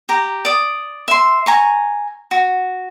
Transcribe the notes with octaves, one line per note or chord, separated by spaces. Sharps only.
G4 A#5
D5 D#6
E5 C6
G#5 A#5 C#6
F#4